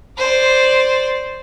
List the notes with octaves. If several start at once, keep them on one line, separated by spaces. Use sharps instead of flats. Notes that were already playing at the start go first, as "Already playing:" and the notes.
C5 D5